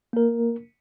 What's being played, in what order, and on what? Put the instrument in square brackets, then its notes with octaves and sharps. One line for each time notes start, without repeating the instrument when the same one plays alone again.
[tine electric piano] A#3 A#4